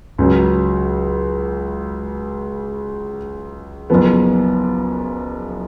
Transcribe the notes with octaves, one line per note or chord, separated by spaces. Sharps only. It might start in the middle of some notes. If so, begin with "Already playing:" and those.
C#2 C#3 F#3
F#1 F#2 F3 B3